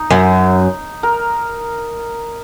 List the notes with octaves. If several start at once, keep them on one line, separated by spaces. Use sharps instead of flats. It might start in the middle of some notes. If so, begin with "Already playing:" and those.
Already playing: D#4
F#2
A#4